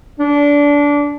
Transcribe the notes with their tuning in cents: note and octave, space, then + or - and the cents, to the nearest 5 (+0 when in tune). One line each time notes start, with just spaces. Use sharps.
D4 -20